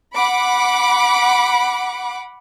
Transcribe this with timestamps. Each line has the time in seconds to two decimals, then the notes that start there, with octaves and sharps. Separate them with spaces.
0.14 F#5 B5 D6